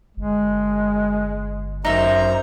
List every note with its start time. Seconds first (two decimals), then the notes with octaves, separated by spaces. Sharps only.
0.17 G1 G#3
1.85 F#2 D#4 C5 E5 A#5